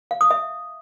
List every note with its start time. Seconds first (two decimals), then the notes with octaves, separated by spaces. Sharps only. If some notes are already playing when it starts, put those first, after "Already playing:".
0.11 F5
0.21 D#6
0.31 E5